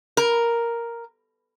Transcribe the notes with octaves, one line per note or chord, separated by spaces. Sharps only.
A#4